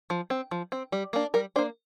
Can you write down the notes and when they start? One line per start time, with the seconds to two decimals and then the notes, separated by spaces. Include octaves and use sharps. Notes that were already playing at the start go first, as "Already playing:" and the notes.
0.10 F3
0.30 C4
0.51 F3
0.72 C4
0.92 G3
1.13 A#3 D4
1.34 G3 A#4
1.56 D4 C5
1.59 A#3